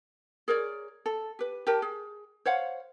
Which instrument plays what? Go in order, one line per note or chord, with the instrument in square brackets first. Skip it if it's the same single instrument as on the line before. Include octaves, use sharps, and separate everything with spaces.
[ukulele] G#4 A#4 C#5 D5
A4
G4 B4
G4 A#4 A5
G#4
C5 C#5 F5 F#5